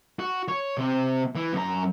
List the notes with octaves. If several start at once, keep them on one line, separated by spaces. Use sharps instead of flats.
F#4
C#5
C3 C5
E3
F#2 A#5